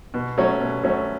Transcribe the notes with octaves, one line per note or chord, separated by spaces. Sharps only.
B2
F#3 A3 C#4
B2
F#3 A3 C#4